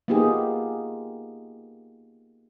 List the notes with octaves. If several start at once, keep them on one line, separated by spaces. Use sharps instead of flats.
A#3 B3 D#4 F4 G4 G#4